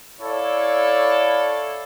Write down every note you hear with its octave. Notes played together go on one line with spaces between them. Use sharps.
E4 A4 C#5 D5 F5 A5